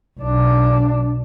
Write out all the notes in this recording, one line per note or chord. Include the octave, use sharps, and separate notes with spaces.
B1 D4